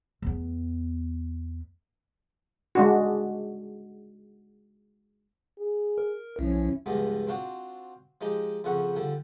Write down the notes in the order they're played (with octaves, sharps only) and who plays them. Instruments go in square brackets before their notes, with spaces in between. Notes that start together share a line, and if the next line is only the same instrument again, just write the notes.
[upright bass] E2 B3
[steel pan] G#3 D4 F#4
[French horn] G#4
[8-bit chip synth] A#4
[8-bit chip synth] B1 F3 [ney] C#4 [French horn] E4
[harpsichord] C#2 G2 F3 G3 G#3 B3
C4 D4 F4 F#4 C5
F3 G#3 D#4 G4
F2 C#3 F3 F#5 C#6
D3 F3 G3